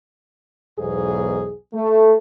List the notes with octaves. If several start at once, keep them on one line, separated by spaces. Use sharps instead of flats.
B1 E2 G#2 G#4
A3